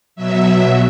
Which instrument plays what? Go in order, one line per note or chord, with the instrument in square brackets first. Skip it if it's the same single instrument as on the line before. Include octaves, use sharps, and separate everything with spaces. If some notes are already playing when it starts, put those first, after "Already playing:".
[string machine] B2 F#3 E5